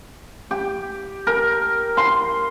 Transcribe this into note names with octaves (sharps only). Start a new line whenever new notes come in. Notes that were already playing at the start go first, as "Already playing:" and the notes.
G4
A#4
C6